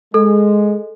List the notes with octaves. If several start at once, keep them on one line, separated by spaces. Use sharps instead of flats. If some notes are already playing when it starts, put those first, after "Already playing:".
G#3 A4